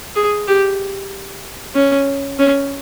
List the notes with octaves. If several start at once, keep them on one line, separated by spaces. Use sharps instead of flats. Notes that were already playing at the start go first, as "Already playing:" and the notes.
G#4
G4
C#4
C#4